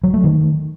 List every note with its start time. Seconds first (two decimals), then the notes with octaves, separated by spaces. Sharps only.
0.04 F#3
0.14 A3
0.24 D#3